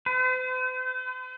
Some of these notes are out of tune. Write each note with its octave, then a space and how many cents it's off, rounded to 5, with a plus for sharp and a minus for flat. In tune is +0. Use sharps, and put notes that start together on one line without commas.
C5 -45